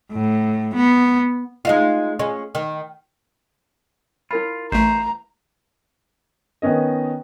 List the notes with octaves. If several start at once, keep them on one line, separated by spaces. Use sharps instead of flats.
A2
B3
G#3 D#4 F4
G#3 C#4
D#3
E4 F4 A#4 B5
A1 A3 C5 A#5
D#3 B3 C#4 D#5